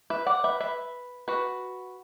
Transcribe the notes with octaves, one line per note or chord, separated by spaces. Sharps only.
B4 E5
D5 F#5
B4 E5
B4 E5
F#4 B4